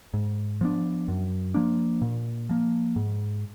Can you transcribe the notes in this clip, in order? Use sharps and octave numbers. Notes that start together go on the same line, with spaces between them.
G#2
F3 B3 D4
F#2
F3 A#3 D4
A#2
F3 A#3
G#2